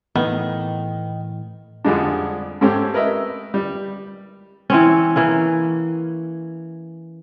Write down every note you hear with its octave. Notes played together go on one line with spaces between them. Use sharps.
A2 D#3 E3 A3 B3
F2 D3 G3 G#3 D4
G#2 A3 C4 C#4 G4
A#4 B4 D#5 E5
G3
E3 C4 C#4
E3 A#3 C#4